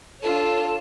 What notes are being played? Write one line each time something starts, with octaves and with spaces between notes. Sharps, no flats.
D4 F4 A4 C#5 A5